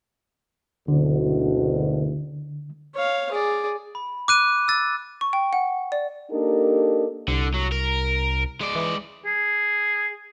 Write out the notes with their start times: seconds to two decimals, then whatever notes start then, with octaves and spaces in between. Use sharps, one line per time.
0.88 F#1 D2 B2 D3
2.95 C#5 F5
3.32 G#4 D5
3.95 B5
4.28 D6 F#6 D#7
4.68 E6 A6
5.21 C#6
5.33 G5
5.53 F#5
5.92 D5
6.32 A#3 D4 D#4 G4 A4 A#4
7.28 C2 D3
7.54 F#3
7.72 A#4
8.61 G#3 D5
8.75 E3
9.25 G#4